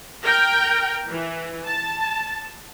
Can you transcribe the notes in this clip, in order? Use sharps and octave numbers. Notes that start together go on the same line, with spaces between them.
A#4 G5
E3
A5